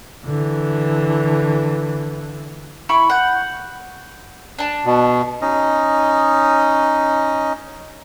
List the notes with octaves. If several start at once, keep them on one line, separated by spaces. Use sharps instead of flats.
D3 E3
E4 B5 C#6
F#5 G6
D4 A5
B2
C#4 D#4 D#5